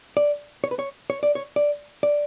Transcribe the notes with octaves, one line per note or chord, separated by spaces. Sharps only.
D5
C#5
B4
C#5
C#5
D5
C#5
D5
D5